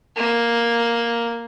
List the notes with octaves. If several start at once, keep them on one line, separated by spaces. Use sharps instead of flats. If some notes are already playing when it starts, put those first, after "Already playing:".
A#3